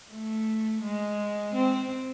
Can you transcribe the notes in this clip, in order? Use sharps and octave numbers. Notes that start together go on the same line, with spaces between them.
A3
G#3
C4